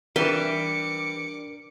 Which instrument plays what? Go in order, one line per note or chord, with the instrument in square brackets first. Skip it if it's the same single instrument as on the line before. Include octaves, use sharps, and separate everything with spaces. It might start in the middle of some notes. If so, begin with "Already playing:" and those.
[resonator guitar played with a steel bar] E3 G3 [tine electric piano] D4 A#4 [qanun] B4 C6 [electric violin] D6 C#7